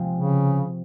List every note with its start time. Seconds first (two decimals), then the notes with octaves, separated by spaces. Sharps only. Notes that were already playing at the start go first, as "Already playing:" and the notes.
Already playing: C3 F3 G#3 C4 F4
0.15 C#3